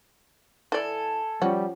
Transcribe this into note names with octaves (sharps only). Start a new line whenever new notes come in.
E3 A4 D5 G#5
F3 G3 C#4 F#4